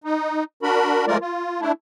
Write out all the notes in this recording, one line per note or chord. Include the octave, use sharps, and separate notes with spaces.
D#4
D4 F#4 A#4 B5
F3 G#3 A3 F4 A#4 D5
F4
A3 D4 E4